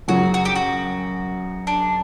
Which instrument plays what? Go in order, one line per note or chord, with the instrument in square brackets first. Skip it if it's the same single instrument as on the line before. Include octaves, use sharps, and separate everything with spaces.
[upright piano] F#2 C#3 F#3 [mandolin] F#4
[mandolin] F#4
G4
F#4
D4